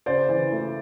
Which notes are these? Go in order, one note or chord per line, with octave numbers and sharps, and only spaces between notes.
C#3 C5 D5
E3
A3